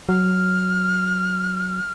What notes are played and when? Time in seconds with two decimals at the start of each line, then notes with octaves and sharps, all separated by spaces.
0.09 F#3 F6